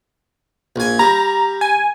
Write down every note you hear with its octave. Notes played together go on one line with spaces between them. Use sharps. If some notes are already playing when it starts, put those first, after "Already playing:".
A#1 G#5
G3 A#5
G#5